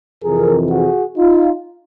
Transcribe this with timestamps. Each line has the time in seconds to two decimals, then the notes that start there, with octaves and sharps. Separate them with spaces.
0.23 F2 C3 E3 G#4 A#4
0.70 F#4 G#4
1.16 D#4 F4